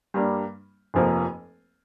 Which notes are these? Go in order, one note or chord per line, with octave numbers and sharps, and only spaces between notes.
G2 G3 A#3 D4
F1 F2 F3 A#3